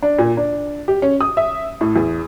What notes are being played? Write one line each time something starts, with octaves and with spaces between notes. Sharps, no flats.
D4
A#2
D4
G4
C#4
D#6
E5
A2
E2